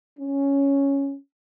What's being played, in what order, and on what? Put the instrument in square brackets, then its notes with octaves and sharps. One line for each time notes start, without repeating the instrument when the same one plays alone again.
[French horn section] C#4